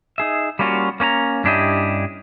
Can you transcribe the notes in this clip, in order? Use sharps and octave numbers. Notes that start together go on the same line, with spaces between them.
D#4 G#4 E5
G3 A#3 C#4 F4 F#4
A#3 C#4 B4 A#5
G2 C#4 D4 E4 G4 D#5